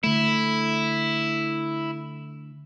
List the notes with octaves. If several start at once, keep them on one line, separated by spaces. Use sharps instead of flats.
D3 A3 E4